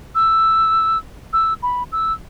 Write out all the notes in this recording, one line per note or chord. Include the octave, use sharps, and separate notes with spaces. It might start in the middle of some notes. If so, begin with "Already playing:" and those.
E6
E6
B5
E6